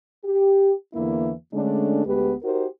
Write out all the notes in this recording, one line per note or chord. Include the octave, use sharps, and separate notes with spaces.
G4
E2 D3 E3 A#3 E4
D3 G#3 A3 C#4 D4
D2 G#3 B3 G4 B4
D#4 F#4 G4 A#4 C5